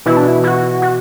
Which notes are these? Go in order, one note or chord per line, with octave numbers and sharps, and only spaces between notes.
B2 E3 E4
D4
E4
E4
F#4
F#4